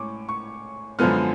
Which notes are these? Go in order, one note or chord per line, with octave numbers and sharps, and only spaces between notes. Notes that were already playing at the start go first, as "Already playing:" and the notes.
Already playing: A2 G#3 C#4 C#6 D6
C#6
F#2 D3 F3 G#3 B3 F6